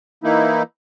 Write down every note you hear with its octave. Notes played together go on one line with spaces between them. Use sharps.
E3 A#3 D#4 E4